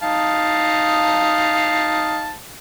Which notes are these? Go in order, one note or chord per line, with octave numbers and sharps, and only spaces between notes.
D#4 F5 A5